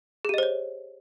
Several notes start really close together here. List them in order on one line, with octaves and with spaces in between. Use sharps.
G#4 G4 D#5 C5 C#5